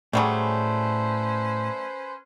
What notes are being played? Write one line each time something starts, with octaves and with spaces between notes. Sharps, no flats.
A2 F#3 G3 A3 C#4 G#4 B4 C5